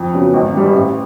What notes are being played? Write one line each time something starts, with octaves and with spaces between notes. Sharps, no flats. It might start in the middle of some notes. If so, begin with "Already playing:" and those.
Already playing: F2
C#3 F#3 B3
G#1
G2 E3 G3
A1